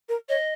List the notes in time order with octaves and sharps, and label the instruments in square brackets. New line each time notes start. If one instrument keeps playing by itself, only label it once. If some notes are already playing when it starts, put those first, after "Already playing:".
[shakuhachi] A#4
[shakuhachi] C#5 [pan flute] D#5